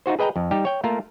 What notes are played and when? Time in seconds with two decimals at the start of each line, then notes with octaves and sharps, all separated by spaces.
0.06 D#4 F4 F#4 C5
0.19 G#4 B4 D#5 G5 A#5
0.36 F2
0.51 G3 D#4 G4
0.65 C#5 G5
0.84 A3 A#3 F4 A#4